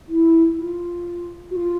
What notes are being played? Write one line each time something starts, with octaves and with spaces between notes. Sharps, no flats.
E4
F4
F#4
F4